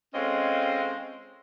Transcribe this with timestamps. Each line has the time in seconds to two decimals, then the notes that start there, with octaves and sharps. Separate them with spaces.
0.14 G#3 C4 C#4 F4 A4 D#5